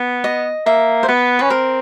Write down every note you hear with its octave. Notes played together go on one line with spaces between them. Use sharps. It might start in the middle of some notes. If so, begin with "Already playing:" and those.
Already playing: B3
D#5
A#3 E5
C5
B3 B4
C#4 B4
C4 A#4